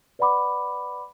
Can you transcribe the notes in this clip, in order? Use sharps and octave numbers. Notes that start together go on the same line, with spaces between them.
B4 D5 F#5 B5 D6